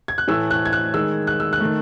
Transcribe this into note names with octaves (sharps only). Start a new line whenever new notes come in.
G#6
F#6
A2 E3 A3 E6
F#6
G#6
F#6
D#3 G#3 E6
F#6
E6
F#6
D#3 A3